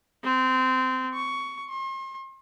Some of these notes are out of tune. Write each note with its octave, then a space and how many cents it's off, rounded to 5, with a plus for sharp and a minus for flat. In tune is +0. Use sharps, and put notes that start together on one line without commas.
C4 -20
C#6 +15
C6 +40